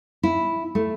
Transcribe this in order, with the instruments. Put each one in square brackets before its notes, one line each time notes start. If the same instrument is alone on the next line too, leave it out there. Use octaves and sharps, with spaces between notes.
[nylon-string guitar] E4
A3